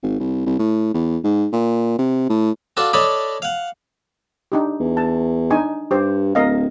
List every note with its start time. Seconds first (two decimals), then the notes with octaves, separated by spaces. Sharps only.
0.03 G#1
0.20 C2
0.46 C2
0.59 A2
0.94 E2
1.24 G#2
1.53 A#2
1.99 C3
2.29 A2
2.77 D4 F4 F#4 A4 A5
2.93 D4 A4 C#5 D#5 A5 B5
3.42 F5 F#5
4.52 D4 D#4 G4
4.80 E2
4.97 A5
5.50 D4 D#4 G#5
5.91 G2 G4 C5
6.35 D1 A#4 D#5 F5